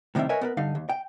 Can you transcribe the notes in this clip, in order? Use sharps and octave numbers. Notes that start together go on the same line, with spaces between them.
A2 C3 D#3 G3 C4 E5
A#4 B4 C#5 D#5 E5 G#5
B3 A#4 B4
G2 D3 D#4 F5
D#2
G5